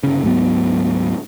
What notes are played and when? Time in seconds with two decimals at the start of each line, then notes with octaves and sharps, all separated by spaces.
0.03 G1 C#3
0.23 D2 G#2 F#3 B3